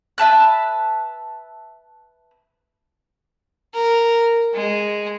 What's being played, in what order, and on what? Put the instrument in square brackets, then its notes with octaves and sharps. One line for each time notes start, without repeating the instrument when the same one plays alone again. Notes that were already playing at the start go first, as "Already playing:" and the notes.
[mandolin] B4 E5 A5 F#6
[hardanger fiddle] A#4
G#3